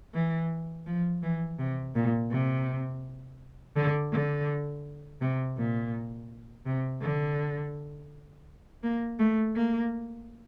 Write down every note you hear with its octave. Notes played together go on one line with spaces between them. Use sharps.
E3
F3
E3
C3
A#2
C3
D3
D3
C3
A#2
C3
D3
A#3
A3
A#3